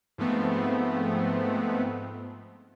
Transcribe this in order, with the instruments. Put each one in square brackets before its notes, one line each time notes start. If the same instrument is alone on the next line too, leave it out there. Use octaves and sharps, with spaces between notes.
[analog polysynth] G#2 F3 A3 B3 C4